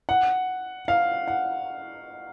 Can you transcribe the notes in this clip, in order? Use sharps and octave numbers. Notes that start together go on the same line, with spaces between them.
F#5
F5
F#5